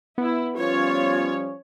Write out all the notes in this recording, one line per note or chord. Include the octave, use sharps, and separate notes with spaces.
B3 E4
F3 G3 C#4 F4 C#5